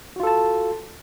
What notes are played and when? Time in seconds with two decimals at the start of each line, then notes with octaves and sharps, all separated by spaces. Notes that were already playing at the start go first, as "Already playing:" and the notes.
0.16 F#4
0.20 F4
0.23 A4
0.27 A5